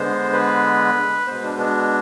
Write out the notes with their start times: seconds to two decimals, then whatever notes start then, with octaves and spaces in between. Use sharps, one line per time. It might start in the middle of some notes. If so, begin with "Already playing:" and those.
Already playing: D3 G#3 B3 C5
0.33 B4
1.27 B2 G#3 B3 C5
1.44 D4
1.59 D4